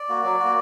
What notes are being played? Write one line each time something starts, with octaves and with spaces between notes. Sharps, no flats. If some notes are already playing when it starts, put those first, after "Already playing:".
Already playing: D5
A#3 F#4
F#3
A#3 F#4